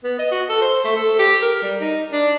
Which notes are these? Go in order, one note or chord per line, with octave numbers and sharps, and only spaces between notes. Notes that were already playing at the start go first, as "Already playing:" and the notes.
B3
D#5
F#4
A4
C5
A3
A4
G4
A#4
G3
D#4
D4